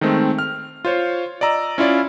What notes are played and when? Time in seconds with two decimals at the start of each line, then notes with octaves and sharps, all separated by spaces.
0.01 D#3 G#3 A3 C4
0.38 F6
0.85 F4 C5 C#5
1.41 D5 D#5 A#5 E6
1.78 C#4 E4 F4 D5